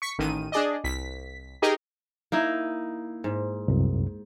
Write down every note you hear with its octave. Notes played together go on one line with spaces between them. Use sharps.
C#6 B6 C#7
A1 D#3 D#7
D4 G#4 D5 D#5
C2 B6
D#4 G4 G#4 A#4 D#5
A#3 D#4 E4
G#2
C2 F#2